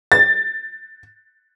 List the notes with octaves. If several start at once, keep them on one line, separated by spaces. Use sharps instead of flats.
A6